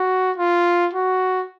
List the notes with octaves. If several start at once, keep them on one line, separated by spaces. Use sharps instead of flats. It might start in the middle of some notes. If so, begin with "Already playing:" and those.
Already playing: F#4
F4
F#4